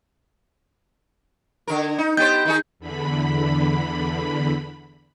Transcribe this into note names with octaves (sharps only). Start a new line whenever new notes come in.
D3 A#4
D#4
B3 G4 C5 G6
D#3 D#4 G#4
E2 D3 B5